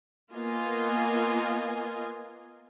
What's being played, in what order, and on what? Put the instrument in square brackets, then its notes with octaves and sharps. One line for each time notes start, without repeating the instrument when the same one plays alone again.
[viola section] A#3 B3 F4 D#5 G#5